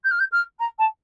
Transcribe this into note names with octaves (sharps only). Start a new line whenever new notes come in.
G6
F6
G6
F6
A#5
A5